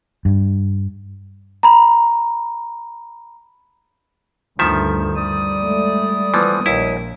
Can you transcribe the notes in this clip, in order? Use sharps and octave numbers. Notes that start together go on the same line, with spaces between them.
G2
A#5 B5
D2 G2 D#3 F3 E5
G3 D5 D#6
G#3 A3
E3 F3 B3
A#1 D#2 E4